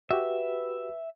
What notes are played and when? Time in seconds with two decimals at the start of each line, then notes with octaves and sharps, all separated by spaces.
0.11 F#4 G4 B4 E5